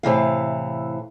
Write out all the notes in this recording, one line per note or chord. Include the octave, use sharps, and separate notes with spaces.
A2 C3 E3 F5